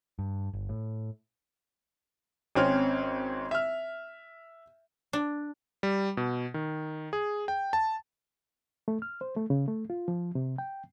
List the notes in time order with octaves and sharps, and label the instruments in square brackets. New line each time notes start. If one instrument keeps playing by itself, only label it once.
[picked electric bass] G2
G1
A2
[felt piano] G#1 C4 C#4 F6
E5 F6
[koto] D4
[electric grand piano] G3
B2
D#3
G#4
G5
A5
[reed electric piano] A3
F6
C5
A3
C#3
A3
F4
F3
C3
G5